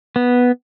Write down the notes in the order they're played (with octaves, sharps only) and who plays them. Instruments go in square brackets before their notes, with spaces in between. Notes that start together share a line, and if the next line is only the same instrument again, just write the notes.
[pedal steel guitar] B3